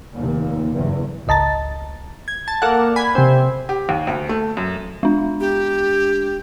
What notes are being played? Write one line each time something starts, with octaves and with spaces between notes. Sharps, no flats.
F1 D#2 A#2
F#1 E2 G2
G#1 C#2 D#5 A5 A#5 A6
G#6
A5
A#3 A4 D5 F#5
G#5 B5 G#6
C3 C4
G4
D#2
D2
A3
F#2
G#3 D4
G4